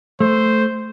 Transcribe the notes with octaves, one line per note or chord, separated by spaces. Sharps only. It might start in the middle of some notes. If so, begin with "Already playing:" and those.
A3 C5